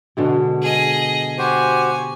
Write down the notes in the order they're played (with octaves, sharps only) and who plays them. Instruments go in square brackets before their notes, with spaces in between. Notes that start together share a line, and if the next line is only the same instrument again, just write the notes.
[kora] B2 D3 G#3
[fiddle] G#4 D#5
[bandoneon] F#4 G4 C5 [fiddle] G#5